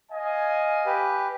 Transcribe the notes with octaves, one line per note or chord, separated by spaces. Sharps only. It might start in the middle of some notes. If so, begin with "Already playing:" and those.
D#5 F5 G#5
G4 B4